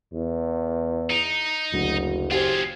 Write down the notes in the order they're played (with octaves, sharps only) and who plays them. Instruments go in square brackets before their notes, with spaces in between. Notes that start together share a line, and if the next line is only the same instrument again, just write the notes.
[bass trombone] E2
[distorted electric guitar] D#4 [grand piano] D7
[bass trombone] F#1 [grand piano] D2 F#3
[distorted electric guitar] F4 G#4 [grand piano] G4 C5 G#5